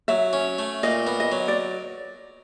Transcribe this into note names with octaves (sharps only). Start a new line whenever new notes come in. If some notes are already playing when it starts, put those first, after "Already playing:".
F#3 E5
C#4
A3
A#2 D#5
B3
D#5
F#3
D5